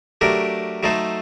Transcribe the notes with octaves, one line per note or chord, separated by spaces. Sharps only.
F#3 A3 D4 G4 A#4
F#3 A3 D#4 A4 C5